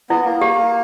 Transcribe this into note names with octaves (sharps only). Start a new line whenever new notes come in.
B3 E4
A#3
A#3 G4